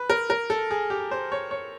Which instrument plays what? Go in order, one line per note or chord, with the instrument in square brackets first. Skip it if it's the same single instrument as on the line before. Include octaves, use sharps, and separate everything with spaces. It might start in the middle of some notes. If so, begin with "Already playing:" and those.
Already playing: [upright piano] B4
A#4
A#4
A4
G#4
G4
C5
C#5
C#5